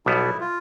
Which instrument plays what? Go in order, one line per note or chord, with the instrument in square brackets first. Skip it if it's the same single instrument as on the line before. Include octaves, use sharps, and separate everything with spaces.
[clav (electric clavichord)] B1 B2 G3 B3 [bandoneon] E4
[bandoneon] F4